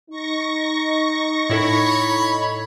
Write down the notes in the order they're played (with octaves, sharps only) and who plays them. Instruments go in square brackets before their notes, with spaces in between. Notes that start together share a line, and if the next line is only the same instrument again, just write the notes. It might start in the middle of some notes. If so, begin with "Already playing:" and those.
[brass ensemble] D#4 [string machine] C#6 A#6
[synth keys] A2 E4 A4 [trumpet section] C#5 B5